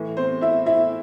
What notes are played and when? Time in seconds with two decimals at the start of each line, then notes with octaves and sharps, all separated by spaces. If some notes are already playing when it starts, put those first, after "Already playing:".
Already playing: A2 E3
0.17 C4 C5
0.41 E4 E5
0.66 E4 E5